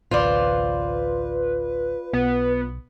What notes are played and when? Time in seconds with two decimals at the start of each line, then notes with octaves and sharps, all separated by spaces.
0.11 A1 D2 F4 B4 C5 D5
2.13 B1 B3